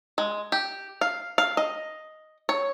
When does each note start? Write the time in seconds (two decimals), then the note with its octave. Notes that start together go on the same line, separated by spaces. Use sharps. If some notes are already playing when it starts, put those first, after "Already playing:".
0.18 G#3
0.52 G4
1.01 F5
1.38 F5
1.57 D#5
2.49 C#5